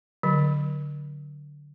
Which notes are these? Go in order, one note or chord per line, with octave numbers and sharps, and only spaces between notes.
D3 F#3